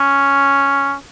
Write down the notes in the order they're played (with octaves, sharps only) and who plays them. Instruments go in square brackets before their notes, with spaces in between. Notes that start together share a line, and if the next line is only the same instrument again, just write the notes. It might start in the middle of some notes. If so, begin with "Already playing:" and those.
Already playing: [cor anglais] C#4